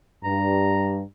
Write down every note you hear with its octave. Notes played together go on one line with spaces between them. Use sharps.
G2 A#5